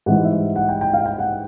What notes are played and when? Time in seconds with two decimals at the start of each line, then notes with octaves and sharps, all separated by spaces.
0.06 G#2 E3 G3 F#5
0.25 E5
0.56 F#5
0.69 G5
0.81 G5
0.94 F5
1.06 G5
1.19 F#5